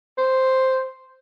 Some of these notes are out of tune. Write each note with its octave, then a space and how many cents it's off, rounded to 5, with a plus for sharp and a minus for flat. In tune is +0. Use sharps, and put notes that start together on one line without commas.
C5 +0